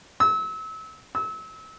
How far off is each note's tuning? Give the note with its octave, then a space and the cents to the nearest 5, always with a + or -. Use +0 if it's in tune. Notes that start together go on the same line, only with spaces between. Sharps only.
E6 -30
E6 -30